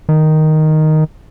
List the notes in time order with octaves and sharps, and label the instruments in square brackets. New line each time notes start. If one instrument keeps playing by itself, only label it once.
[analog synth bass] D#3